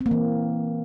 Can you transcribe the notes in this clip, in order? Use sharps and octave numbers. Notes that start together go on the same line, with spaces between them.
C4
A#3
E3